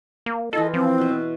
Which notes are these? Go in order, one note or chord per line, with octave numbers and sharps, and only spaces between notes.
A#3
E3 E4 F4 A4 D#5
F3 C4
B2 E5